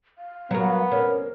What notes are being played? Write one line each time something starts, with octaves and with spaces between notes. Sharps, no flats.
F5
F#3 B3 A#4
C#4 A#4